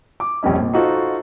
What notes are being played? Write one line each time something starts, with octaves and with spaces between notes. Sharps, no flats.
D6
F1 A#1 G3 C#4 D#5
A#2
D#4 F4 F#4 A4 C5